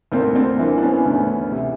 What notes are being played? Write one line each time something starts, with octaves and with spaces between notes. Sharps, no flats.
D2 A#3 C4
C4 D4
E3 A#3 C4
D4
B3 C#4
D2
C3